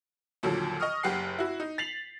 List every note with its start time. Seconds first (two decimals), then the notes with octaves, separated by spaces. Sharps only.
0.43 D#2 A#2 D3 F3 F#3
0.80 D#5 C#6 D#6 F6
1.03 F#1 G4 F#5 C7
1.38 E4 F#4
1.60 D#4
1.78 A6 B6 C7 F7 F#7